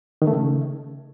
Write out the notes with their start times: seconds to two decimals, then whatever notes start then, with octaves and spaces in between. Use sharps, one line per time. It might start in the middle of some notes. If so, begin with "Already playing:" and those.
0.22 D#3
0.27 A3
0.33 C#3